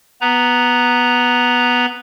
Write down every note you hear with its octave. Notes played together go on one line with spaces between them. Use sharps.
B3 B4 A#5